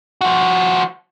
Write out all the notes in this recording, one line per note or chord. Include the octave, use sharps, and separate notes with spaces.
F3 F#4